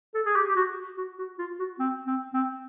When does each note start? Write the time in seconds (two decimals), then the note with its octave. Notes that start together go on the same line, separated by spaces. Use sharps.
0.14 A4
0.26 G#4
0.36 G4
0.48 G4
0.56 F#4
0.98 F#4
1.18 F#4
1.39 F4
1.59 F#4
1.80 C4
2.07 C4
2.34 C4